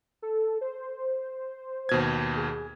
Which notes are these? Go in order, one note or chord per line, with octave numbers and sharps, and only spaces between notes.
A4
C5
D#2 B2 G#6
G#4